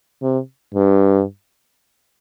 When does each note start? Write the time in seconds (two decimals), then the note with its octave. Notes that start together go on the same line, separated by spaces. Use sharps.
0.22 C3
0.75 G2